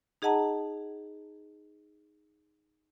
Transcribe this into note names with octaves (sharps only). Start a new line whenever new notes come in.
D#4 G#4 D#5 F#5 A5 A#5